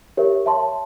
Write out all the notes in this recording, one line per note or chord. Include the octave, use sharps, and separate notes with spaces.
G4 A#4 C#5 E5
C#5 E5 A5 C6